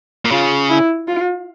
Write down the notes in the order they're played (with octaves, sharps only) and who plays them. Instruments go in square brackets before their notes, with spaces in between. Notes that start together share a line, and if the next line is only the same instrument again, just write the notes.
[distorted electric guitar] A#2
[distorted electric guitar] C#3 [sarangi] F4
[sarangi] E4
F4